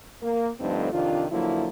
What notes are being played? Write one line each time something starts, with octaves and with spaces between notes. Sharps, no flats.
A#3
G2 D3 F3 A3 C4 D#4
F2 C3 D#3 D4 F4
D3 F3 F#3 A#3 E4